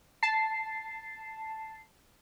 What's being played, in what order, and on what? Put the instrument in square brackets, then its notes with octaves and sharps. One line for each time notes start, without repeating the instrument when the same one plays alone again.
[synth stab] A5 [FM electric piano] C7